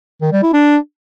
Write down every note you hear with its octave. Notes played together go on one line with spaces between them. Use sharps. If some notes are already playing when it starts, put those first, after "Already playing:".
D#3
G3
E4
D4